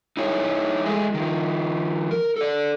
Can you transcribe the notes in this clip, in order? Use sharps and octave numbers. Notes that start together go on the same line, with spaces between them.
D#4 E4 G#4 C#5
E3 G#3 A3 G#4
D#3 F3
A#4
A4 D5